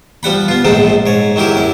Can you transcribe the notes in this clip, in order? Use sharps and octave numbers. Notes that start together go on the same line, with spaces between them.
F3 G3 F#5 B5
B3 F4
A#1 G#2 C4 D#4 A4
G#2 C#5
D#3 F#3 E4 G4 A#4
F#2 E4